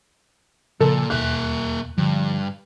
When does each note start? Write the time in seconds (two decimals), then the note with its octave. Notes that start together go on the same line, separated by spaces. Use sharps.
0.80 A#2 C#3 F3 A4
1.10 E1 D#2 B2 A#3 E5 F#6
1.98 G2 D3 F3